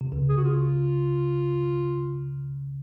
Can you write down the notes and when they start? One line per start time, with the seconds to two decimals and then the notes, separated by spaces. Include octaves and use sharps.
0.01 C3
0.12 C#2 C#3
0.29 G#4
0.37 F#4
0.44 F4